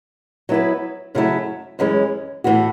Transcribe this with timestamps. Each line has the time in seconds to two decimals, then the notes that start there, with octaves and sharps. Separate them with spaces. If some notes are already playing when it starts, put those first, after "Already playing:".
0.49 F#3 B3 E4 B4
1.15 F#2 C#3 F#3 A3 E4
1.79 F#2 E3 G#3 C#4
2.44 A2 E3 B3 F#4